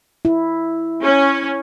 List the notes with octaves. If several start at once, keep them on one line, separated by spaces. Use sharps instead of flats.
E4
C#4